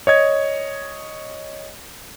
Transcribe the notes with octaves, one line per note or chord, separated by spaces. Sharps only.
C#5 D#5 G#6